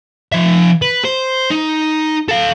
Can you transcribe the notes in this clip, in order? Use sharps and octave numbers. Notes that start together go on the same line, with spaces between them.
F3 E5
B4
C5
D#4
A4 F5